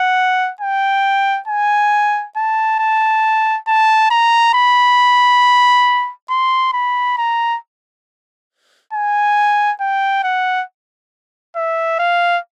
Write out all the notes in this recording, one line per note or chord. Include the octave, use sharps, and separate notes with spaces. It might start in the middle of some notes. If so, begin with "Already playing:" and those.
Already playing: F#5
G5
G#5
A5
A5
A5
A#5
B5
C6
B5
A#5
G#5
G5
F#5
E5
F5